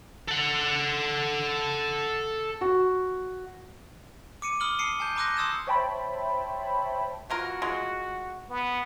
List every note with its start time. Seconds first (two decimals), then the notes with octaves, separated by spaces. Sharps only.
0.28 A4 F#5
2.61 F#4
4.42 D6 C#7 D#7
4.60 B5 D#6 F6 F#7 G7
4.79 A5 C7 C#7 D#7
5.00 G#5 A5 G6
5.16 A#5 C6 D6 E6 F#6 A#6
5.37 A5 C6 D#6 E6 G#6 E7
5.67 C5 C#5 E5 G5 A5 B5
7.30 E3 F4 F#4 A#4
7.62 G#3 F4
8.49 B3